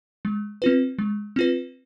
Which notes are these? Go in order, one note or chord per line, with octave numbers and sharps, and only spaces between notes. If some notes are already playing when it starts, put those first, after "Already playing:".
G#3
C4 F4 B4
G#3
C4 F4 B4